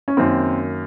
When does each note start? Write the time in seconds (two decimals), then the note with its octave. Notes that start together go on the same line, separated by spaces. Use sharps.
0.08 C#4
0.17 F#2 D#3 A#3 C4